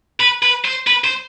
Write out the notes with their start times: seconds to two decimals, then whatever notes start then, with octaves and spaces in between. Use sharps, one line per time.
0.20 B4
0.43 B4
0.65 C5
0.87 B4
1.04 C5